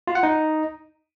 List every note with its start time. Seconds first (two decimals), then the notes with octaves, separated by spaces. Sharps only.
0.07 F4
0.15 F#5
0.23 D#4